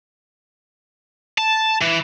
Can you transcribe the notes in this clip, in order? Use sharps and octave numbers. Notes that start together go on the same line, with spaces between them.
A5
E3